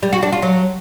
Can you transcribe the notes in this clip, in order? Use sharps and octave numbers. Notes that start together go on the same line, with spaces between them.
G3
F#4
D4
F4
F#3